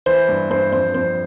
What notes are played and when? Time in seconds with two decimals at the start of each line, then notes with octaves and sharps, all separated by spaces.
0.06 E3 C5
0.28 G2
0.50 G2 C5
0.72 F2 C5
0.94 F2 C5